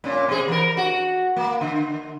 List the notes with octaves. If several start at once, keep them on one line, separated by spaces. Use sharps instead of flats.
A#2 C#4
B2 G#4
E3 A#4
F#4
A#3
D3